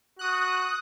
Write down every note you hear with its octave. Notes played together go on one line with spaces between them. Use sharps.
F#4 D#6 F#6